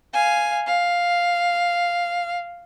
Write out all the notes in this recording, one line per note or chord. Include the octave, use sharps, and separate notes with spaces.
F5 G#5
F5